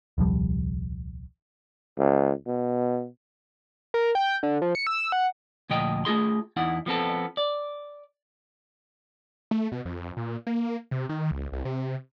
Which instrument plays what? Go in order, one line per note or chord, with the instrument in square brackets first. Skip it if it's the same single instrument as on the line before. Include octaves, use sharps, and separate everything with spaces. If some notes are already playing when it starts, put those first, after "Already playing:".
[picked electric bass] D#1 C2 F3 G3
[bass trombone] C#2
B2
[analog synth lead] A#4
G5
D3
F3
C#7
E6
F#5
[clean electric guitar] D2 A#2 F3 D#5 G5
A3 F4 G#4 C6
E2 D#4 E4 F#5
F3 B3 C4 A4
D5
[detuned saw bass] A3
B2
F2
A#2
A#3
C3
D#3
C#2
C2
C3